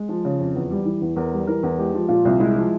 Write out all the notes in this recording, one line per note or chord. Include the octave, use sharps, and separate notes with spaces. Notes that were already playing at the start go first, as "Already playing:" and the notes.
Already playing: G#3
F3
C#3
F2
E2
G3
E3
E2
E2 A#4
G3
E3 A#4
E2
G#3 G4
F3
A#2 F4
C2
G#3 E4
F3